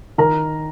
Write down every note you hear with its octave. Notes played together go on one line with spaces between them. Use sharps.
D#3 A#4 A#5